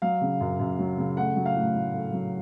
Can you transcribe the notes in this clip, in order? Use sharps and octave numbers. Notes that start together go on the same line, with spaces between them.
F#3 F5
C#3
F#2
F#2
F#3
C#3
A3 F#5
F#3
F5
A2
A2
A3
F#3